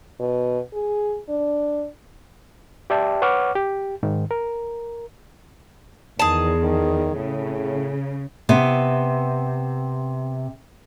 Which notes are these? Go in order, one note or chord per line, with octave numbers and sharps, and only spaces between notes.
B2
G#4
D4
G4 D5 E5 G5 A5
B4 C#5 F#5 C#6 D6 F6
G4
G#2 D#3
A#4
E2 D#3 G#4 A5
D#3
A2 C#3
C3 B3